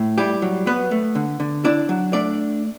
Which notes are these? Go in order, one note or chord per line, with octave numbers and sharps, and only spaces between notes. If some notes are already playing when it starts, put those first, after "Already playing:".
Already playing: A2
G3 E4 G4
F#3
F#3 B3 B4
A3
D3
D3
D4 E4 D5
F#3
A3 D4 D5